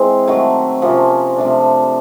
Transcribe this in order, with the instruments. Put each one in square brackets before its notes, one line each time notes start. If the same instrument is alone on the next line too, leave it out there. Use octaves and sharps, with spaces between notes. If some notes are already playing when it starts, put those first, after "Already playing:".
Already playing: [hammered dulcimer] E3 G#3 C4 E4
D#3 F#3 A3
C3 F3 A#3 C#4
C3 F3 A3 D4